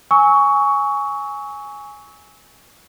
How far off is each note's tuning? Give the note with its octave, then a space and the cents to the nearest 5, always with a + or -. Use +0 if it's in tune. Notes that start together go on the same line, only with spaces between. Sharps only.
G#5 +0 C#6 +15 E6 -30